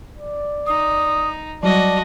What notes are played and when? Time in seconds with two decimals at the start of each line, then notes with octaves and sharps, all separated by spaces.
0.17 D5
0.67 D#4 D#6
1.63 F#3 G3 F#4 D5 D#5 A5